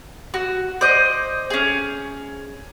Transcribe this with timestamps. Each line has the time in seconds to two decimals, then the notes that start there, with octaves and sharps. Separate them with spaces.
0.34 F#4
0.81 C5 D5 D#5
1.50 C#4 G#4